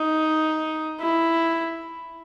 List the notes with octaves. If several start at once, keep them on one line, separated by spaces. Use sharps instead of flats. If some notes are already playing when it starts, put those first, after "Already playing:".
Already playing: D#4
E4